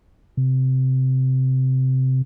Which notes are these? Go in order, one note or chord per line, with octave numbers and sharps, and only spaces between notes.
C3